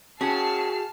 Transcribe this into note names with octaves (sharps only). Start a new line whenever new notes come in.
C#4 F#4 G#4 A5 F6 C7